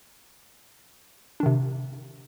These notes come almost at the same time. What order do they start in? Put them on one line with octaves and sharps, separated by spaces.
D4 D#3 C3